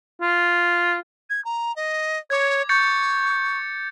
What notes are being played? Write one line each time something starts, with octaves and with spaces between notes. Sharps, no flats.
F4
G#6
A#5
D#5
C#5 D6 G#6
C#6 G6 A6 C#7